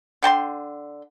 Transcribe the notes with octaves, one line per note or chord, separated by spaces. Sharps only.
D3 G5 A5 C6